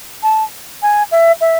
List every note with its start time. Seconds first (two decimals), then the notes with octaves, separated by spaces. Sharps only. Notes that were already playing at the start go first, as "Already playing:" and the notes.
0.23 A5
0.82 G#5
1.12 E5
1.41 E5